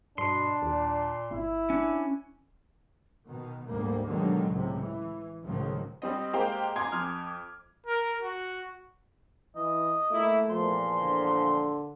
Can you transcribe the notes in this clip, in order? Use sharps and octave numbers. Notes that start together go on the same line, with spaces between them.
G2 B2 D4 C6
D#2 A#2
G1 E4
C#4 D4
B2 D#3
D2 G#2 G3 A#3
B2 D3 D#3 F#3 G#3
C#2 A2 C3
E3
C#2 A2 D#3 F3 F#3 G#3
G3 C4 D#5
G#3 A#3 G4 C5 F5 G5
G#5 A#5 C6 D6 G#6
F2 F6
A#4
F#4
E3 D#5
A3 A#3 E4
E2 A#2 F3 C6
D3